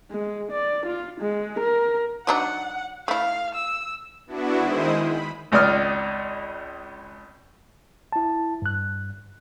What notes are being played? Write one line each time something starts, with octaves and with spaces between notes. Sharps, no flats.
G#3
D5
F4
G#3
A#4
F#3 D4 D#4 F#5
A3 E4 F5
E6
B3 D4 E4 F#4
D#3 G#3 E4 C5 D#6
B5
G#1 C#2 D5 D#6 F6
E4 A5
G2 F#6